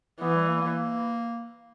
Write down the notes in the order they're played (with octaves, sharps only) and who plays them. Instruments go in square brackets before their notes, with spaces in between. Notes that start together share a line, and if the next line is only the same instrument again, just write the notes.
[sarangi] E3 [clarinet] B3
[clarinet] G3
A#3
A#3